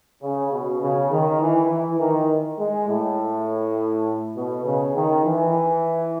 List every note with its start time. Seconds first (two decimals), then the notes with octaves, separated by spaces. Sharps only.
0.23 C#3
0.52 B2
0.82 C#3
1.11 D#3
1.41 E3
1.70 E3
2.00 D#3
2.59 G#3
2.89 A2
4.36 B2
4.65 C#3
4.95 D#3
5.25 E3